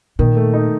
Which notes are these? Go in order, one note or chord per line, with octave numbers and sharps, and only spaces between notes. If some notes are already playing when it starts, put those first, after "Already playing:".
A#2 D#3
A3
D#4